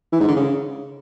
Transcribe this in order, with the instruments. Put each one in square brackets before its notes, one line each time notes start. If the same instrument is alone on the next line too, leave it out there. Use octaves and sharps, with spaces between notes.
[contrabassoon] E3
G#2
D3
C#3